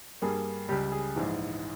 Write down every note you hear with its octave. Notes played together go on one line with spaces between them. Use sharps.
G2 G3 A#3 G#4
C#2 C#3 G3 G4
G#4
A#1 G#2 E3